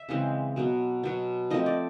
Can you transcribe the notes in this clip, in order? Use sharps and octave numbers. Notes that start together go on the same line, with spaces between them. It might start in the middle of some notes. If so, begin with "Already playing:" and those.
Already playing: E5
C#3 E3 G#3 C4
B2 F#3 B3
B2 F#3 B3
F3 A3 C4 D#5
D5